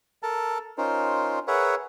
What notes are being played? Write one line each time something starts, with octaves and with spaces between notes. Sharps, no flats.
A4 A#4 A5
C#4 D#4 F4 A#4 C5
G#4 A#4 B4 C#5 E5 F#5